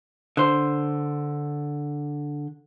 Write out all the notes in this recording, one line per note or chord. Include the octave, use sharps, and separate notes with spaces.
D3 C5